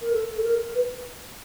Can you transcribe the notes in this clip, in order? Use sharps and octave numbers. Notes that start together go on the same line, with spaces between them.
A#4
A4
A4
A#4
B4